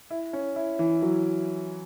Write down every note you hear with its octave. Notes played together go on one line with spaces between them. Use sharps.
E4
C#4
E4
E3
F#3